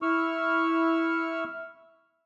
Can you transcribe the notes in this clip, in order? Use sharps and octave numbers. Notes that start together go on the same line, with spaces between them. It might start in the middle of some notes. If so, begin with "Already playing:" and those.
E4 C#6 E6 F6